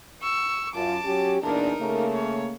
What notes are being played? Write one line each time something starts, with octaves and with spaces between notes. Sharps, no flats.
C#6 E6
F#2 F4 A5 D6
F#3 C#4 G4
E2 A#2 D4 D#4 A#4
C#3 A3 A#3
C#5